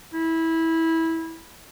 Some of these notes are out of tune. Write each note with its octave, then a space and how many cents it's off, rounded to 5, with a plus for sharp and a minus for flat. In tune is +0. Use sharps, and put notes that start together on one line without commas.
E4 -15